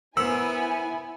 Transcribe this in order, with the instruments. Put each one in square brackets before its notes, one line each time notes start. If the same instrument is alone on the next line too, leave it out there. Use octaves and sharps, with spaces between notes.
[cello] B3 [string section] E4 G#5 [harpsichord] A#4 C5 F#5 [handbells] E6